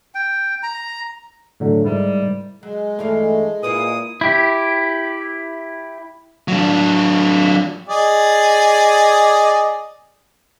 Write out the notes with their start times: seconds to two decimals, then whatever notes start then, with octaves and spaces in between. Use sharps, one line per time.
0.15 G5
0.63 A#5
1.60 A2 D3 F#3
1.85 G#2 G3 E4 A#4
2.63 F#3 G#3
2.99 G2 E3 A3 F5
3.63 A#2 E4 F4 B4 D#6
4.21 E4 G4
6.48 F#3 D4
7.89 G#4 D5 D#5